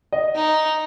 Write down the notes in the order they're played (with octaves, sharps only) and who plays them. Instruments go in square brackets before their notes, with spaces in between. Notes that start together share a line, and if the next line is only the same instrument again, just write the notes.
[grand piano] D#5
[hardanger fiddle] D#4